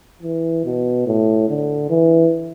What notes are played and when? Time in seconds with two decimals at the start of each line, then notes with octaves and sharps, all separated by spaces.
0.23 E3
0.65 B2
1.07 A2
1.49 D3
1.90 E3